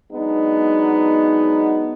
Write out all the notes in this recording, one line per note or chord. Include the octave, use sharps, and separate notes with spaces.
F#3 G#3 B3 D4 D#4